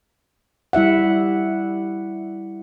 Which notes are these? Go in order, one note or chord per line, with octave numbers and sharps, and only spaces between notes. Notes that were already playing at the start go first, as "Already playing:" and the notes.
G3 E4 E5 F#5